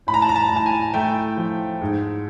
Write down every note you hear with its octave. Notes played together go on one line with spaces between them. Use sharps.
A2 B5
A#5
A5
A#5
A5
A2
A5
G#5
A3 G5
F3
G#2